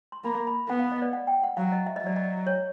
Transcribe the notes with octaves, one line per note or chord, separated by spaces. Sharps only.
C6
A#3 B5
B5
B3 F#5
F5
D#5
D5
F#5
G5
F#5
F#3 F5
D#5
E5
D#5
F#3 D5
D#5
C#5